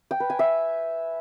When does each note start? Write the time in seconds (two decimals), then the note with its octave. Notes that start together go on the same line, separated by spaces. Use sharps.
0.11 G5
0.20 B4
0.30 G#5
0.39 E5